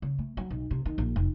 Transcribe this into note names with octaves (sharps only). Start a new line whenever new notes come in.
C#3
A3
F#3
B1
C3
D#3
A#1
F1